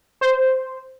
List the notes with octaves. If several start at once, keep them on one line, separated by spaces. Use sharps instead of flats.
C5